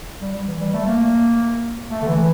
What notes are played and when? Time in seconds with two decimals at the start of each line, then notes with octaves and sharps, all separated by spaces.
0.21 G3
0.47 E3
0.60 G3
0.73 A3
0.86 A#3
1.90 A3
2.02 D3
2.07 E3